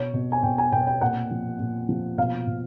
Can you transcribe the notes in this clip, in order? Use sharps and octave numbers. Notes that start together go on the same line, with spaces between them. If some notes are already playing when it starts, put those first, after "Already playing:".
Already playing: B2 C#5
B2
G#5
B2 G5
G#5
B2 G5
G5
A#2 F#5
F3
A#2
F3
B2 F5
B2